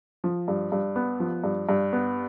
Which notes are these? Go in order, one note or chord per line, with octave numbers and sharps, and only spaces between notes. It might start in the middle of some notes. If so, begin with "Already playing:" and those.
F3
G2
G2
B3
F3
G2
G2
B3